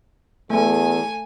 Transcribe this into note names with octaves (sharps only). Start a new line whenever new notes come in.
E2 A3 G#5